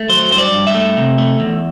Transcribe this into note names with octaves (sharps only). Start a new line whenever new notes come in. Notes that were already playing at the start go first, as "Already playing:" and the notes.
Already playing: A3
F#3 C5
G2 C5
D5
G2
E5
A3
C3
A3
E2